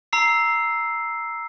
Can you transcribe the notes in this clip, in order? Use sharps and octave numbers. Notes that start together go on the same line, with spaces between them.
A#5 E6 C7